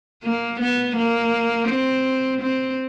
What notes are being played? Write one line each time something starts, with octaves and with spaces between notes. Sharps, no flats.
A#3
B3
A#3
C4
C4